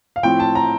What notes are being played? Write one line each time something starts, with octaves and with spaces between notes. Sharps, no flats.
F5
A2 F3 C4 G5
A5
A#5